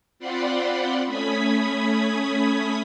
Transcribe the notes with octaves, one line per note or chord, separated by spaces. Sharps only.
C4 F4 D5 F#5 B5 C6
A3 C#4 B5 D#6 G#6 B6